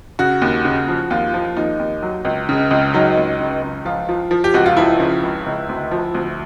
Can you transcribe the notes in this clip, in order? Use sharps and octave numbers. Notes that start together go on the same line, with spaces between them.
C#3 F#4
D#2
C#3
F3
D#2 F4
F3
D#2 D#4
D#2
F#3
C#2
C#3
C#2
F#3 D#4
C#2
C#3
C#2
F3 F4
F3
F3
G4
C#2 F#4
F4
F3 E4
C#3
C#2
C#2
D2
F3
D2